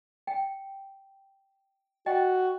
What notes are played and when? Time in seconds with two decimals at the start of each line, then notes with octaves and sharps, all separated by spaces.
0.27 G5
2.06 F#4 D#5 G5